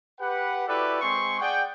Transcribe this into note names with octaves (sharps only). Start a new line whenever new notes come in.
G4 B4 F#5
E4 F#4 G4 A4 B4 D5
G#3 C4 G#4 C6 C#6
G#4 D5 F#5 G5